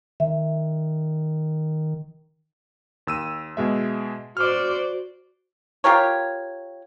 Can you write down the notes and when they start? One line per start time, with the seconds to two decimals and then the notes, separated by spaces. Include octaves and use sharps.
0.20 D#3 E5
3.07 D#2 E6 D#7
3.57 B2 G#3 E5
4.37 F#4 C5 D5 D6 F6
5.84 F4 G4 A#4 C#5